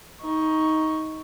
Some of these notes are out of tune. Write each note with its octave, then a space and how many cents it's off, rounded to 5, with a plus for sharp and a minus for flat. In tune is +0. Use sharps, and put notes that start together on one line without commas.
D#4 +15 C#6 +0